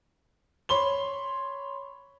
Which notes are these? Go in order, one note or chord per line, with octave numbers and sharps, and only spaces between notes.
C#5 B5 C6 G7